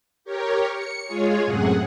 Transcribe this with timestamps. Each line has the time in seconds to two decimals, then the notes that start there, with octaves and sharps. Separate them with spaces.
0.24 G4 A#4 C#5
0.71 C#7
1.06 G#3 F4 G#4 C#5
1.45 F#2 A2 C3 G#4 F#5